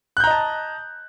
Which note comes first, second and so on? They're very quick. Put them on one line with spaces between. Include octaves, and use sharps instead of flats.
F#6 G6 A#5 D#5 A5